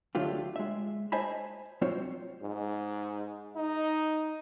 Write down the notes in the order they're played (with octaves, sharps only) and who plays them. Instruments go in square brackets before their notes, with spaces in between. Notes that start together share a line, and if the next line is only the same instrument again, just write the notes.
[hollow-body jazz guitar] D2 D3 F#3 A3 F4 G4
G#3 E5
C5 D#5 G#5 A5 B5
F#3 C4 F4 C5 C#5
[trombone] G#2
D#4